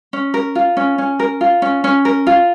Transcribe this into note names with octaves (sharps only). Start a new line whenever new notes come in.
C#4
A#4
F4
C#4
C#4
A#4
F4
C#4
C#4
A#4
F4